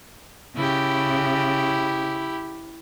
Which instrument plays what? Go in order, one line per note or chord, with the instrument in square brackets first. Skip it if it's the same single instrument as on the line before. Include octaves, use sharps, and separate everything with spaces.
[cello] C#3 [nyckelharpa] E4 G4